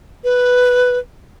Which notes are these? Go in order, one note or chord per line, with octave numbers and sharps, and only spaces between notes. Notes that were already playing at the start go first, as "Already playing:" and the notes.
B4